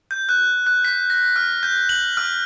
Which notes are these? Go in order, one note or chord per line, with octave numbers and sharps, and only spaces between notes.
G6
F#6
F#6
B6
A#6
F6
G6
F#7
F6